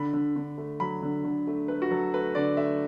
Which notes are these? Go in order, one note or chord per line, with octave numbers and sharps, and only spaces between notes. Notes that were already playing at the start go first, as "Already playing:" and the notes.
Already playing: D3 B5
D3
D3
A3
F#3 B5
D3
D3
A3
A3 B4
F#4
F#3 A4
A3 B4
D3 D5
A3 E5